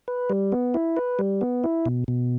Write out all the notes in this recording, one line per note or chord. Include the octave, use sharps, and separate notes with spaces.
B4
G3
B3
E4
B4
G3
B3
E4
B2
B2